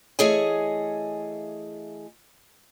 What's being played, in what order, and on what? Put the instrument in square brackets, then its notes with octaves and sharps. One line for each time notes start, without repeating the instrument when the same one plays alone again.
[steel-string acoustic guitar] E3 A3 G#4 C#5 D#5 G#5